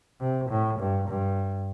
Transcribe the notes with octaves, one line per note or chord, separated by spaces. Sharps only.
C3
A2
G2
G2